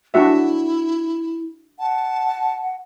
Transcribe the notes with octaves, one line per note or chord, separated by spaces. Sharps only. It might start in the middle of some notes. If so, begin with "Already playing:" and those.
D4 E4 F#4 E5
F#5 A5